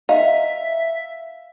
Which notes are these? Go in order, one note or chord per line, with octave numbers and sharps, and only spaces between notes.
D#4 E5 F5